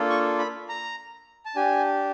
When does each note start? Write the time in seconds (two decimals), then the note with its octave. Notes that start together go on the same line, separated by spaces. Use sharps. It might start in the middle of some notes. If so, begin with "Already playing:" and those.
Already playing: A#3 D4 F4 A4
0.10 C#6
0.39 B5
0.69 A#5
1.45 A5
1.56 D4 G4 G#5